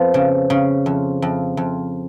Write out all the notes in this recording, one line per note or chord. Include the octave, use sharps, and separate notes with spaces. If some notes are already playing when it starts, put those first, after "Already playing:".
Already playing: F2 F3 B3
C#3
C#3
F2
F2
F2